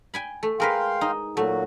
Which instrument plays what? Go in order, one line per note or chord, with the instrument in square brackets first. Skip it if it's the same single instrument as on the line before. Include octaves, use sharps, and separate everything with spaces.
[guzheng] G5 G#5 B5
A3
[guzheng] G#3 A#4 B4 [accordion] F5 G5 C6
[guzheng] D#4
[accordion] A#2 F#3 F#4 [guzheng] A3